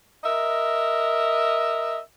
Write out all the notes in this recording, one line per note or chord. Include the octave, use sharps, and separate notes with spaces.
A#4 D#5 E5